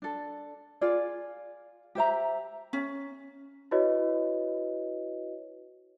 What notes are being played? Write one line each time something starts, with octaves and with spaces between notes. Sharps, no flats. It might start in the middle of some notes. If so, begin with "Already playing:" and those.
D4 A4
F4 G#4 D5
G4 C5 E5 A#5
C#4
E4 F#4 B4 C#5 D#5